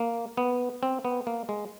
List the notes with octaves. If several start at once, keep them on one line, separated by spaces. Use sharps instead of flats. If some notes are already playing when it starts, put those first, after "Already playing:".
Already playing: A#3
B3
C4
B3
A#3
G#3